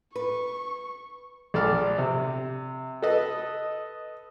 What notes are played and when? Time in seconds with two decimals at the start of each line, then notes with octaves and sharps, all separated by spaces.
0.16 B4 C#6
1.54 A#1 A4 D5 F6
1.98 C3
3.02 A4 B4 D#5